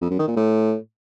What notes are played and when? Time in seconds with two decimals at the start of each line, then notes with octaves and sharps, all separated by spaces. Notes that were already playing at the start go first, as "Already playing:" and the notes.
0.01 F2
0.10 F#2
0.19 D#3
0.28 A#2
0.37 A2